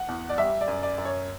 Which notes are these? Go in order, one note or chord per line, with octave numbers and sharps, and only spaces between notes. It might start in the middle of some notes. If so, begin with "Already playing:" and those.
Already playing: F#5
E2
D5
G3 E5
D5
F#2
D5
F#2
C#5